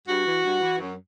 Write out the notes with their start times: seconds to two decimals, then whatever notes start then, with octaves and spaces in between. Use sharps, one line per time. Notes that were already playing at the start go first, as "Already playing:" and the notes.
0.08 G2 F#4
0.27 E3
0.44 G2
0.61 E3
0.79 F#2